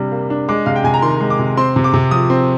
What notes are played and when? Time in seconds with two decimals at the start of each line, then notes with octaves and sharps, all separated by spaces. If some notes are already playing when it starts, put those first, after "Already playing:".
Already playing: C3 G3 D4
0.12 A#3
0.30 D4
0.49 G#3 D6
0.66 C3 F5
0.76 G5
0.84 C3 G#5
0.94 A#5
1.02 D#3 C6
1.21 G#3
1.30 D6
1.39 C3
1.57 C4 C6
1.76 C3
1.84 D6
1.94 C3
2.11 F3 D#6
2.30 C4